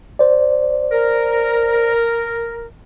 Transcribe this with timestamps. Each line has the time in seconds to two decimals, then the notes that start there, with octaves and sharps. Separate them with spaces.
0.19 C5 D5
0.91 A#4